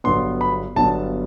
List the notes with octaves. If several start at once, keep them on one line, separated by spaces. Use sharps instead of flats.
G1 G2 F#3 B3 C6
B5
G1 G2 F#3 B3 A5